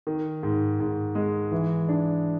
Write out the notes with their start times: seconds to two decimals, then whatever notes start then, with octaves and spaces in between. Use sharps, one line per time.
0.07 D#3
0.43 G#2
0.80 G#2
1.15 G#3
1.51 E3
1.89 D4